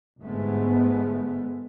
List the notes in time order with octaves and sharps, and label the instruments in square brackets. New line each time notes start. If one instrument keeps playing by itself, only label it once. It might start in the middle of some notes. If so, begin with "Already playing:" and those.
[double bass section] G1 G#2 G#3 A3 B3